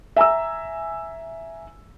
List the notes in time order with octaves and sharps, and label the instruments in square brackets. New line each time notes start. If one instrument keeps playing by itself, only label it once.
[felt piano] E5 G#5 A#5 E6